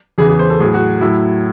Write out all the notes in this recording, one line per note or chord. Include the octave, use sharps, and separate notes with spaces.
E2 C#3 E3 G#4
G#4
C5
A4
A2 F#3 G#4
F#4
A2 F#3 E4